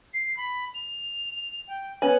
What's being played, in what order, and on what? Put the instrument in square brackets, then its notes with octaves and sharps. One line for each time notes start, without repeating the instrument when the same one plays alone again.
[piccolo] C7
B5
F7
G5
[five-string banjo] B3 C#4 G#5 [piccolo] F#7